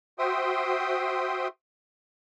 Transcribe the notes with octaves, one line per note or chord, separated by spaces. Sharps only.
F#4 C5 E5 G5 C6 D#6